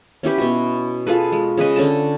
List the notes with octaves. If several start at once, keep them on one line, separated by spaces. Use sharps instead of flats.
C#4 E4 G4 B4
B2 F#4
F4 G#4 A4 B4
G#3
C#3 G#4 B4 D#5
D3 C#4 A4 A5